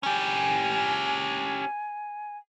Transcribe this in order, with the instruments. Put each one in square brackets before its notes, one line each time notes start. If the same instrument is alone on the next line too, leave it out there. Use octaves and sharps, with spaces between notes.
[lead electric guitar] C#4 G4 [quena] G#5